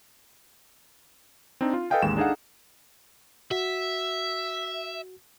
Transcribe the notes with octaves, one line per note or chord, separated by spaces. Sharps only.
C4 D4 D#4
F4
A4 B4 D#5 F5 G5 G#5
A1 D#2 G#3 E7
D4 D#4 G#4 A4 F5 F#5
F#4 E5